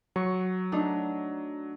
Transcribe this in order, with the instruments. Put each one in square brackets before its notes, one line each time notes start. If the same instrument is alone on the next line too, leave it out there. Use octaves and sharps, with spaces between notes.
[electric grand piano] F#3 [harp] C#6
[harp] A3 D4 D#4